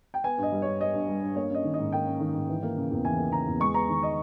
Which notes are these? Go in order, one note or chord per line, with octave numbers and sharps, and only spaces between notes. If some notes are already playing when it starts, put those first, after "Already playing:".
G5
B3 G#5
G2
D#5
G3
G2 C#5
B3 D#5
G2
G3
G2
A#3 C#5
C#4 D#5
D#3
G#2 D#5
A#3 G5
C#4
D#3
G#2
E3
A#3
C#3
E2
E3 G#5
A#3
C#3 A#5
E2
G#3 C#6
B3 A#5
D#3
D#5